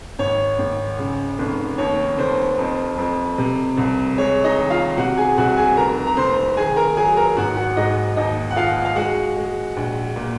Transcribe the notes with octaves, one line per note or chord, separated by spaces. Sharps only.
G#1 C#5
G#1
C#3
F1
D#2 C#5
F1 C5
F2 C5
F2
C3
C2
G#3 C#5
D#4 D#5
D#3
F4 F5
C3 F#4 F#5
G#4 G#5
C2 F#4 F#5
G#4 G#5
F1 A#4 A#5
A#5
F1 C5 C6
D#3 G#4 G#5
A#4 A#5
F#3 G#4 G#5
A#4 A#5
G#1 F#4 F#5
F#4 F#5
G#2 D#4 D#5
D#2 D#4 D#5
F#5
D#2 F4 F5
F5
G#3 F#4 F#5
G#3
A#1
A#2